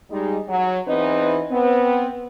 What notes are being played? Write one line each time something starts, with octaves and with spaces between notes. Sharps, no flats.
G3 G#3 D#4
F#3
E2 E3 C4 D#4 B4 D#5
B3 C4